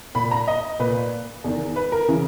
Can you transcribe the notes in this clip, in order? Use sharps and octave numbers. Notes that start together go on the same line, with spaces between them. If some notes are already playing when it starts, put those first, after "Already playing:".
A#2 B5
A#5
D#5
A#2 B4
E2 D#3
B4
A#4
C#3 E3